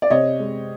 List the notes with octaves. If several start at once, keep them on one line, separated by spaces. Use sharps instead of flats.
D5
C3 C#5 D#5
G#3